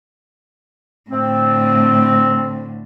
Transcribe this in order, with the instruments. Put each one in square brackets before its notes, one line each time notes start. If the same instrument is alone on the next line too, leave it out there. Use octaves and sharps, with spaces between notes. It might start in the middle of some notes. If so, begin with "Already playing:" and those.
[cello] A2 D3 [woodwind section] C4